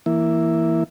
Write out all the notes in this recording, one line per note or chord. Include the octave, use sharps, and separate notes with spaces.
E3 A#3 E4